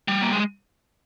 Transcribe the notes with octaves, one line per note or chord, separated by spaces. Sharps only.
G3
A#3
G#3